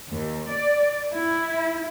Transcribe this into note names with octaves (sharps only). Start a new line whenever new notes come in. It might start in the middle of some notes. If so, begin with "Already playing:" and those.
D#2
D5
E4